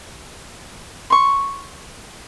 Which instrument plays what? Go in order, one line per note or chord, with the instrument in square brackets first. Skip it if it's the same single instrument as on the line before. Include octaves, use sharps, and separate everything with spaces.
[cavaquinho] C6 C#6